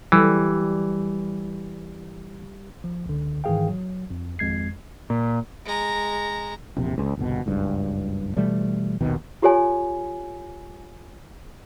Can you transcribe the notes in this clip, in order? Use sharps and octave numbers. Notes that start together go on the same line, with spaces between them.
E3 G3
F3
C#2 D3
G#2 D#3 E3 G#4 F5 G5
F#3
F2
G#1 F2 G#3 G#6 C7
A#2
G#3 A#5
E1 A#1 C3
C#2
G1 C2 B2
F#1 C#2 G2
B2 E3 G3 A3
A#1 D#2 B2 D#3
F4 G4 A4 C#5 G#5